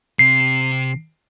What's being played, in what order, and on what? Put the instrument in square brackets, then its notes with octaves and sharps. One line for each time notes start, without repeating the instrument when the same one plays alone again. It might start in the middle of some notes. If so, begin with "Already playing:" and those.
[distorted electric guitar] C3 [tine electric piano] C7